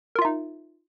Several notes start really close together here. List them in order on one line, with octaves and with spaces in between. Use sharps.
A#4 F4 E5 D#4